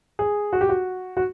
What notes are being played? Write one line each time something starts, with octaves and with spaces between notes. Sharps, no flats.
G#4
F#4
G4
F#4
F#4